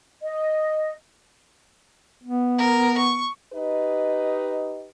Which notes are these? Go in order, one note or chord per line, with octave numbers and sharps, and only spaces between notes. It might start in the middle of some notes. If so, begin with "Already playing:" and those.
D#5
B3
A#4
C#6
D#4 G4 B4 D#5